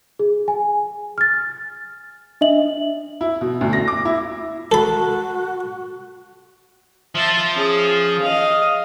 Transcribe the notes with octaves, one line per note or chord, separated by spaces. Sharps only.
G#4
G#5
F6 A6
D4 D#5 E5 F#7
E4
B2
D2
A#6
D6
E4
F#4 A4 B5
F3 E5 A5
C#4 G#4
D#5 F5